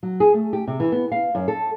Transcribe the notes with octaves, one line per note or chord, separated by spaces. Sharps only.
F#3
G#4
A3
G4
C3
E3
B3
F5
F#2
A4